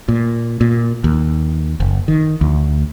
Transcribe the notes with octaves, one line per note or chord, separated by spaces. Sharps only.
A#2
A#2
D#2
F#1
D#3
D2